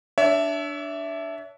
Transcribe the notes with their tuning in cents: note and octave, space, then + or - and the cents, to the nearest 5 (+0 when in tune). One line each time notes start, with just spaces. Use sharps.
D4 -5 C#5 +40 E5 +0